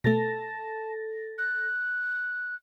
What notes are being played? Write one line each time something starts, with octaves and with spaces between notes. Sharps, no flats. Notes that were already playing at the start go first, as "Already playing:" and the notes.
B2 A3 A4 A5 A6 A#6
F#6